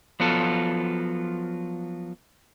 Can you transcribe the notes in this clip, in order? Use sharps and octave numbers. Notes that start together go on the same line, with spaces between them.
F3 F#3 B3 F4 A4